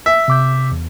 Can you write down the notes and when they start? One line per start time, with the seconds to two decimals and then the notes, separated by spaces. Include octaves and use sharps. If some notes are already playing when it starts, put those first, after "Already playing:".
0.06 E5
0.28 C3 D6 G6
0.72 E2